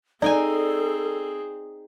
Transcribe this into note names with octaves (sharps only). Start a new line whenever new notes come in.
C4 D#4 G#4 A4 D5 G5 G#5